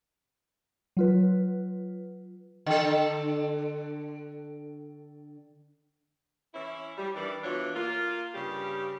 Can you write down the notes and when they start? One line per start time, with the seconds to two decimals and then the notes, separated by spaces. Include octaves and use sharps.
0.97 F#3 F4 B4
2.66 D3 A4
6.53 E3 C#4 E4
6.96 G3
7.14 D#3 E3 G3 D4
7.43 B2 E3 D4 F4 C#5
7.74 A#3 F4
8.34 G2 C#3 G3 G4